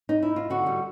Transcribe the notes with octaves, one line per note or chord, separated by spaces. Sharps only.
D#4
E4
F4
D3 F#4
G3